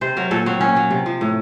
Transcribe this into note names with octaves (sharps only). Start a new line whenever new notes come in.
C3 C5
F#3 A#4
A#2 A4
F#3 C4
A#2 C#4
F#3
C3
F3
A2